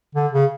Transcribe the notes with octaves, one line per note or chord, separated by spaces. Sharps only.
D3
C#3